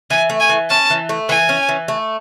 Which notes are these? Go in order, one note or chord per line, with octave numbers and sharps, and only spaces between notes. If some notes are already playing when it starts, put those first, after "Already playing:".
E3 G#5
A3
G#5
E3
C#4 A5
E3
A3
E3 G#5
C#4
E3
A3